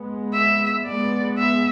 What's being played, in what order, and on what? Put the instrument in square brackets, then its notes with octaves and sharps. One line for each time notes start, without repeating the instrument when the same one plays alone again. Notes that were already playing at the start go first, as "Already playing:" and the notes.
Already playing: [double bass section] G#3 B3
[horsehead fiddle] E5
[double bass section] G#3 B3 [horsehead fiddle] D5
[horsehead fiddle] E5